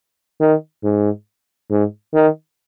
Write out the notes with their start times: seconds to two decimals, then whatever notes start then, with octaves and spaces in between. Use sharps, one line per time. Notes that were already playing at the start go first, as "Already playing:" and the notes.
0.40 D#3
0.84 G#2
1.70 G#2
2.14 D#3